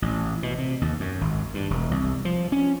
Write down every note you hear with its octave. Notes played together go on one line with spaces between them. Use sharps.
A1
B2
C3
D#2
F#2
G#1
G2
E1
C2
F3
C#4